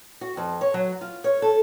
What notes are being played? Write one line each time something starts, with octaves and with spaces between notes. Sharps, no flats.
F#4
F2
C#5
F#3
F4
C#5
A4